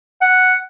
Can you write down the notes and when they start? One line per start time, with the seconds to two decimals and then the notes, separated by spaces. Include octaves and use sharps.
0.21 F#5